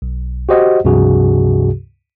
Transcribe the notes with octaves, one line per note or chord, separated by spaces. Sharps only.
B1
F#4 G4 C5 D#5 F#5
C#2 G2 C3 F3 F#4 G#4